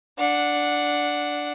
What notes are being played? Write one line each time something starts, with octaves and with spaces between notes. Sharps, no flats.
D4 F#5